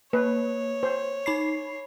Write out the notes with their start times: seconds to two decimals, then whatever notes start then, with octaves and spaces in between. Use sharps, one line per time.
0.13 A#3 B4 C#5
0.83 C5
1.26 D#4 B5 C7